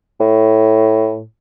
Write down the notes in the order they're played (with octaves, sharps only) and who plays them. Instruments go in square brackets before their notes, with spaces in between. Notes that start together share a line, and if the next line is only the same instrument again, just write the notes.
[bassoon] A2